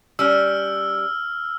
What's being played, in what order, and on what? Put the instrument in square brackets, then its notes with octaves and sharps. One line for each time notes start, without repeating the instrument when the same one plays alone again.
[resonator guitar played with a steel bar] G3 C#4 [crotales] E6 F6